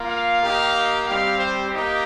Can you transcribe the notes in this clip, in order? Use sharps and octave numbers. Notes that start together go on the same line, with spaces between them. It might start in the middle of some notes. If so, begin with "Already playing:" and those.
Already playing: A#3 F4
F5
A#3 D#4 G4
G3 C4 G4 F5
C5
A#3 D#4 G4